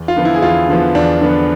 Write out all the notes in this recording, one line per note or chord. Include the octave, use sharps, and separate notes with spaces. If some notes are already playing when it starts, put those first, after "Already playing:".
Already playing: E2
F4
D3 F3 B3
E4
G#4
E2 F4
D3 F3 B3
E2 D4
D3 F3 B3